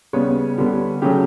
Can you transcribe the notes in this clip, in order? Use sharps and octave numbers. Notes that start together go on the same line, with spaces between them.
C#3 G3 B3 C#5
D3 G3 B3
C#3 F#3 A3 G4